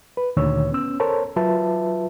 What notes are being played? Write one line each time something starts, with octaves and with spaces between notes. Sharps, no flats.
B4
D2 A#2 D#3 C#5 E6
B3 C#4 E6
A4 A#4 C5 C#5 A5
F#3 F4 B4 E5 A5